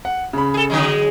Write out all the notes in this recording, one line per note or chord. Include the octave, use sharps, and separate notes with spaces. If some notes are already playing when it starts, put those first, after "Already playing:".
F#5
C#3 B5
G#4 A4
D3 F#3 G#3